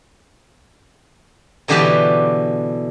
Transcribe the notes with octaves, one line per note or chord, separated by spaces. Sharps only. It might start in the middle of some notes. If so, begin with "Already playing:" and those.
B2 D3 E3 G4 B4 A5